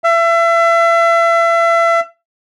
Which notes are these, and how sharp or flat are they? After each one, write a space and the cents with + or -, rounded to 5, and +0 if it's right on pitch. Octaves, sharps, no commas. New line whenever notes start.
E5 +35